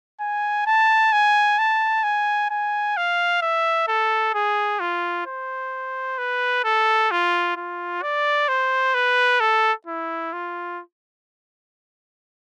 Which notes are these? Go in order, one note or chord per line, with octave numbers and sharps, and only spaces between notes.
G#5
A5
G#5
A5
G#5
G#5
F5
E5
A4
G#4
F4
C5
B4
A4
F4
F4
D5
C5
B4
A4
E4
F4